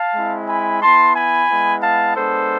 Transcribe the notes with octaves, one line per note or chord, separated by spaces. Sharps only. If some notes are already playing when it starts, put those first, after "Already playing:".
Already playing: F5 A5
G#3 C4 E4
G#5 B5
B3 E4 A5 C6
G#5 B5
G#3 B3 E4
F5 A5
G#3 B3 D4 A4 C5